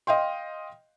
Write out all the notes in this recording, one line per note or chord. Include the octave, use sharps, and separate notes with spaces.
D#5 F5 G5 C6